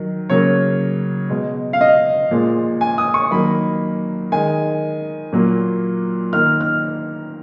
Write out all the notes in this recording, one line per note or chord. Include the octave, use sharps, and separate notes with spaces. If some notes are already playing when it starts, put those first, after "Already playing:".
Already playing: D#3 F#3
C#3 F#3 A#3 C#5
B2 G#3
F5
D#5
A#2 F3 G#3
G#5
D#6
C#6
D#3 F#3 A#3 B5
D#3 G#3 G#5
A#2 F#3 A#3
D#3 A#3 F6
F6